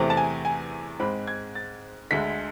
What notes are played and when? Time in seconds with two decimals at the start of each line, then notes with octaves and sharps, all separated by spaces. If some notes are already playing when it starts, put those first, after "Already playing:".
Already playing: E2 C3 E3 A3 C4
0.10 A5
0.17 G#5
0.45 G#5
1.00 G#2 G#3 C4 B5
1.28 G#6
1.55 A6
2.11 D2 D3 G#3 B6